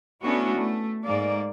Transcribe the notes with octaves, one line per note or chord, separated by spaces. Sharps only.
A3 B3 C#4 D4 E4 F#4
A3
G#2 A#3 D5